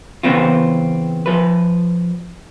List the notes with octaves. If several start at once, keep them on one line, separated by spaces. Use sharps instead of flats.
C#3 E3 B3 C4 F4
F3 B4